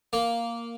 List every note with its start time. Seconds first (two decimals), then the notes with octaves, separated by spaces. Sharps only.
0.13 A#3